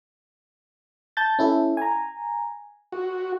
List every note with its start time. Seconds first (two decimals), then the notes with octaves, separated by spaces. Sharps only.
1.17 A5 G6 A6
1.39 C#4 E4 A4
1.77 G#5 A#5
2.92 F#4